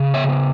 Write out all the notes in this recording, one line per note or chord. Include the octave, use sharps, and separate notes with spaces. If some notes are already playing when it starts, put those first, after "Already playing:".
Already playing: C#3
C#5 E5
B3